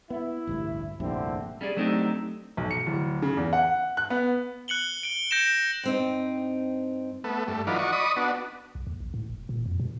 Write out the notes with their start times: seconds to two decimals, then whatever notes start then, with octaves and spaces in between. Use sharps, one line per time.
0.10 B3 E4
0.47 A1 D2 G2
1.00 F1 A#1 G2 D3 C4 E4
1.61 G3 C#4 G#4 D5
1.76 F#3 A3 C4 D4 D#4 G4
2.57 B1
2.71 C#7
2.86 D1
3.22 C#3
3.37 E2
3.53 F#5
3.97 F#6
4.10 B3
4.68 F#6 C#7 F#7 G7
5.03 D7 G7
5.31 G6 A#6 C#7 D7 E7
5.83 G2 C4 D#4
7.24 A3 B3
7.48 G2 A3
7.67 E3 F#3 D#4 F4 B4 D5
7.79 F#4 D5 D#5 C#6
7.92 D5 D#5 B5 C#6 D#6
8.17 B3 D4 F#4
8.75 B1
8.87 D#2
9.00 A#1
9.14 A2
9.30 E1
9.49 A#2
9.66 F2
9.80 B2